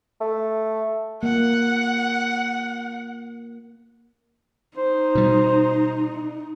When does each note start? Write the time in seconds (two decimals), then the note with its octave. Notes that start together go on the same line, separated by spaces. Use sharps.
0.21 A3
1.23 A#3 F#5
4.77 D#4 C5
5.15 B2 G3